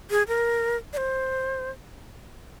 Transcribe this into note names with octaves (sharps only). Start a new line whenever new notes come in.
G#4
A#4
D5
C5